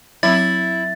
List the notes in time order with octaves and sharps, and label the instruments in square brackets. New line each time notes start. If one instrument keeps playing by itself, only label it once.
[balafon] F#3 C4 [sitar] E4 [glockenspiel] A6